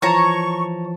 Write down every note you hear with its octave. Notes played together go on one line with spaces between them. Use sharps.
E3 F3 C#5 A5 A#5 C#6